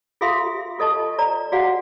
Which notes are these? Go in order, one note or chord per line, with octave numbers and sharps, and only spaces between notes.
F4 G#4 A4 E5 F5 C6
G4
F4 A4 D#5 A5 C#6
D5 A#5
F#4 G#4 D5 F5 F#5